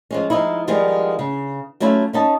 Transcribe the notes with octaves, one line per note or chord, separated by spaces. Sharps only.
F3 G#3 C#4
F3 G#3 D#4 E4
D#3 F3 G3 G#3 B3
C#3
F#3 A3 C#4 E4 F4
C#4 D#4 A5